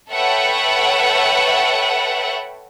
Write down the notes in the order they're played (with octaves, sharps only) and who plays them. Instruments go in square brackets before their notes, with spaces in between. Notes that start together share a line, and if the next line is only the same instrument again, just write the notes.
[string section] A4 B4 C#5 E5 F#5 G5